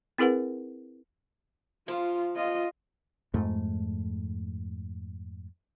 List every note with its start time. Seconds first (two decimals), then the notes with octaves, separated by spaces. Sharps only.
0.18 C4 E4 G#4 A#4 B4 F#5
1.88 F3 F4
2.36 F4 D#5
3.34 F2 G#2 A3